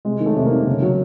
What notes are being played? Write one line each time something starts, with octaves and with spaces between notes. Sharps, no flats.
C3 G#3
D#3
A3
C3
A#3
D#3
C#3
F#3